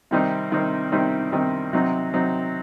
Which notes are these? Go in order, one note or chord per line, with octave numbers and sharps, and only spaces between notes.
C3 D#3 G3 C4 D#4
C3 D#3 G3 C4 D#4
C3 D#3 G3 C4 D#4
C3 D#3 G3 C4 D#4
C3 F#3 C4 D#4
C3 F#3 C4 D#4